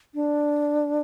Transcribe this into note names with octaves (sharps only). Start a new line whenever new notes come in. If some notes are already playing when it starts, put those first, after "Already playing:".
D4